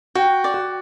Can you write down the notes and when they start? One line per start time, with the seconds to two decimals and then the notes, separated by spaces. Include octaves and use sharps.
0.15 F#4 G5
0.44 D5
0.54 F#4